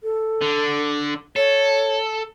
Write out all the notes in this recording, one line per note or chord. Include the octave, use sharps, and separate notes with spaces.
A4
D3
A4 C#5